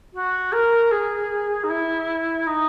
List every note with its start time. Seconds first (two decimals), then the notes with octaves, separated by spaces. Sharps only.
0.13 F#4
0.52 A#4
0.91 G#4
1.63 D#4
1.69 E4
2.46 D#4